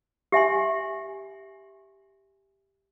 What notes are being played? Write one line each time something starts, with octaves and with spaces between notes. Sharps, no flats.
G4 E5 G#5 C6